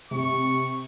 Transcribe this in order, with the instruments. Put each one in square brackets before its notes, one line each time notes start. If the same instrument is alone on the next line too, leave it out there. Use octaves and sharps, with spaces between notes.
[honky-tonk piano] C3 [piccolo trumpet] C#6